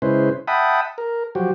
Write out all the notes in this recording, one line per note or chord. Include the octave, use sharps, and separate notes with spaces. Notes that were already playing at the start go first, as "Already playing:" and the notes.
C#3 G#3 C#4 E4 B4 C5
E5 F#5 G5 A5 B5 D#6
A#4
F3 F#3 F#4 G4